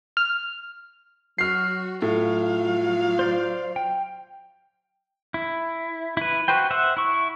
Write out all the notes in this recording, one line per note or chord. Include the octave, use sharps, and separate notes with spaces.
F6
F#3 F#4 F6 C7
A2 F#3 F4 F5
C5 D5 G6
G5
E4
E4 B4
F#4 B4 C5 G5
C5 E5 F#5
E4 C#6